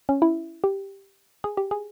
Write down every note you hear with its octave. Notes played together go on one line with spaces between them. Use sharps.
C#4
E4
G4
G#4
G4
G#4